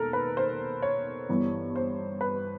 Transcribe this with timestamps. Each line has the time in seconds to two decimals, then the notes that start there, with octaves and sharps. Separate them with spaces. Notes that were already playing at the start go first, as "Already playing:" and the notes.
Already playing: E1 D#2 D#3 A4 A#4
0.13 B4
0.37 C5
0.83 C#5
1.29 G1 G2 E3 G3
1.76 C5
2.21 B4